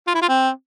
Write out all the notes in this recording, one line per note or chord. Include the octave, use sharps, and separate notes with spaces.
F4
E4
F4
C4